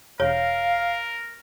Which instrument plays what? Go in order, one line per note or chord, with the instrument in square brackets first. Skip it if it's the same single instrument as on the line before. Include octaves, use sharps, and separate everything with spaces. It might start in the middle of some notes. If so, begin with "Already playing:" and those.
[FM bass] E1 [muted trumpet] A#4 [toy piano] C#5 [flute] F5